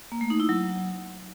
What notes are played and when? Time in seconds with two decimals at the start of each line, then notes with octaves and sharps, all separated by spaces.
0.12 A#3
0.21 A3
0.30 D#4
0.40 E4
0.49 F#3